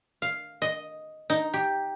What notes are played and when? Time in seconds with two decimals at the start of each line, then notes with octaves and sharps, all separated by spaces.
0.22 F5
0.62 D#5
1.30 D#4
1.54 G4